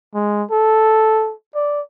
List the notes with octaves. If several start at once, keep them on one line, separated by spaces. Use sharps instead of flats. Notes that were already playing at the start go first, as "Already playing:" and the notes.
G#3
A4
D5